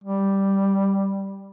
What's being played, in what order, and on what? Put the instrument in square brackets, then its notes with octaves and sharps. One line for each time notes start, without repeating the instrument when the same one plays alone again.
[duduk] G3